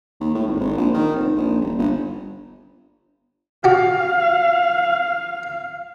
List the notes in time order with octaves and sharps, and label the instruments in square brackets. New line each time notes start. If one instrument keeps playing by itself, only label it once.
[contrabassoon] D#2
A2
G#1
G#1
A#1
D#3
F1
A#1
D#1
G1
[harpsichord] F#4 G4 [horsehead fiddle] F5